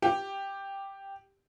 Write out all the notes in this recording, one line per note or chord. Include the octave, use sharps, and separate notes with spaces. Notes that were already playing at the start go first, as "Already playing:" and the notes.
G4